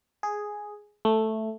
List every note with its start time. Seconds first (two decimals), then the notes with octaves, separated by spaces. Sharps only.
0.23 G#4
1.05 A3